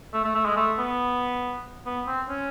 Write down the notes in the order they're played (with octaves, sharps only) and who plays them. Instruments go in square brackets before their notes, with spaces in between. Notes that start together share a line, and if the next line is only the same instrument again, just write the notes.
[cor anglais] A3
A3
A3
G#3
A3
B3
B3
C4
C#4